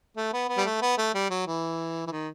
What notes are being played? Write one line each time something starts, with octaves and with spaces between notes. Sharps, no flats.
A3
B3
B3
G3
A3
B3
A3
G3
F#3
E3
E3
D#3